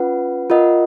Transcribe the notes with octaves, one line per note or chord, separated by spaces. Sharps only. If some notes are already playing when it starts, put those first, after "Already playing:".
Already playing: C#4 F4 B4 F#5
F4 A#4 D#5 F#5